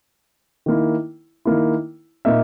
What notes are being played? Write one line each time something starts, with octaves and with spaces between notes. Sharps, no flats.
D#3 A#3 E4
D#3 A#3 E4
A#2 A#3 D#4 A#4 E5